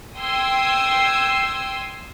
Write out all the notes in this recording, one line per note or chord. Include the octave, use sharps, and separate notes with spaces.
G5 C6 D#6 E6 G#6